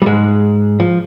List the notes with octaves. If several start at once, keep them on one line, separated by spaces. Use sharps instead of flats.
G3
G#2 G#3
F3